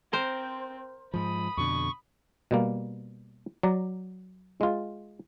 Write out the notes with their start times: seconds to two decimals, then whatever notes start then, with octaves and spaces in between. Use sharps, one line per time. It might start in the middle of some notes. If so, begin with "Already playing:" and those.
0.13 C4 A#4 C5
1.14 G#2 F3 B5 D#6
1.57 F2 B2 D3 C#6
2.51 B2 G3 A#3
3.63 F#3 D5 A#5
4.61 G#3 F4